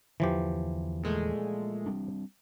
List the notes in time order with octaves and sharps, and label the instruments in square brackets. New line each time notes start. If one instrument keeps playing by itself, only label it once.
[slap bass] E2 D3 [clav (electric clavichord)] E3 F3 G4
[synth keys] A#2 G#3 A3
[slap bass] G3 C4 D4